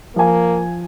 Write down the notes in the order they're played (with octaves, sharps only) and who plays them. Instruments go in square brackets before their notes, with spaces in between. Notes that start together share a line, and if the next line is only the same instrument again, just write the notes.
[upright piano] F3 G#5 [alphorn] A#3